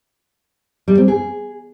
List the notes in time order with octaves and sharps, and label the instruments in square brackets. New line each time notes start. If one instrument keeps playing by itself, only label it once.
[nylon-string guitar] G3
C4
G#4